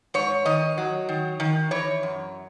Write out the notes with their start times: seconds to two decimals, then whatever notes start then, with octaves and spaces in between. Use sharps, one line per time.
0.14 G#2 C#5
0.45 D#3 D#5
0.78 F#3
1.09 D#3
1.40 D#3
1.71 E3 C#5
2.03 F#2